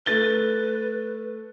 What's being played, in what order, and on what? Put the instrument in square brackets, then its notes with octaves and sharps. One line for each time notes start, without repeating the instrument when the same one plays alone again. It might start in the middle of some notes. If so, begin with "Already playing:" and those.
[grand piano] A3 A6 G7 [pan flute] B4